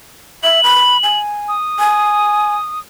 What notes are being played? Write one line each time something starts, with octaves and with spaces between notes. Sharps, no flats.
E5 F#7
B5
G#5
D#6
G#5